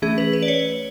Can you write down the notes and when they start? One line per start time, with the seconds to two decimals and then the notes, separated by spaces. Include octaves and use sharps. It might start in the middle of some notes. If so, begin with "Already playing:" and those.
0.02 E3 A3 C#4 G#4
0.18 B4
0.33 B4
0.42 D5
0.48 C#5